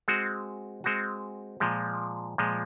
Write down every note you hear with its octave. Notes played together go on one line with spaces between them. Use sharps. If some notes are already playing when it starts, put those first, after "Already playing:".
G#3 C4 F#4
G#3 C4 F#4
A#2 F3 G#3
A#2 F3 G#3